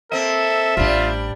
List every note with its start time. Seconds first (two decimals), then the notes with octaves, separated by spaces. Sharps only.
0.12 A#3 C4 A4 E5
0.77 A1 A2 G3 D4 F4